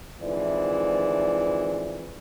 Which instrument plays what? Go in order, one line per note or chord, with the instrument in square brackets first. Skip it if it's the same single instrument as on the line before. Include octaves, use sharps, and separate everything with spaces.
[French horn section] F2 G#2 D3 E3 E4 D5